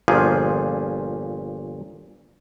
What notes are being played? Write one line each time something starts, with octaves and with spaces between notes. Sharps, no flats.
G1 A#2 F3 G#4